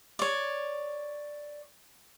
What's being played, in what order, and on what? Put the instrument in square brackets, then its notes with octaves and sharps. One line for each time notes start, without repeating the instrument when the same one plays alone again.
[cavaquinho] C#5 D5